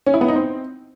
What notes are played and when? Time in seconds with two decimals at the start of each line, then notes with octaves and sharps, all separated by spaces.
0.06 C#4
0.14 E4
0.21 B3
0.28 D#4
0.36 C4